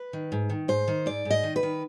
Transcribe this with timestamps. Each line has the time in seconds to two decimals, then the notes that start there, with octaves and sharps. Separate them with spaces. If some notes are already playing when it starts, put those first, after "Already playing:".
Already playing: B4
0.13 D#3
0.32 G#2
0.50 D#3
0.68 G#2 C5
0.88 D#3
1.06 G#2 D5
1.25 G#2
1.30 D#5
1.43 D#3
1.56 B4
1.63 D#3